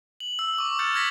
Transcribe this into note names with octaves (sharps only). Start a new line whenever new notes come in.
F#7
E6
C#6 D6
E6 F6 G6 A6 C#7
F6 G6 G#6 A#6 B6 F#7